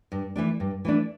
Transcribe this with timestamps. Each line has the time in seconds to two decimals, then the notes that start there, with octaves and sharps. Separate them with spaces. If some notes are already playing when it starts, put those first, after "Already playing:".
0.12 G2
0.36 E3 A3 D4
0.60 G2
0.85 E3 A3 D4